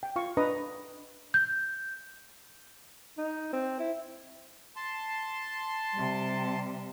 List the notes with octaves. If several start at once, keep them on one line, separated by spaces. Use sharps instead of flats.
G5
F4 F5 C#6
D4 B4 D#5 A#5 D#6
G6
D#4
C4
E4
A5 C6
C3 G3